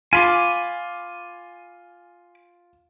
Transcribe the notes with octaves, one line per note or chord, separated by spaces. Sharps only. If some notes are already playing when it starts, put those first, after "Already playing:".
F4 G#5 B5 D6